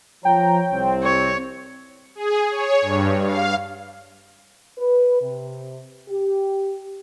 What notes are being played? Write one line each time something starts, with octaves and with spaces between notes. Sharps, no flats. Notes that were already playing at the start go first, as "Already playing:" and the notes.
F3 C#5 G5 A#5
C2 C4
C#5
G#4
C#5
G2
F5
B4
C3
G4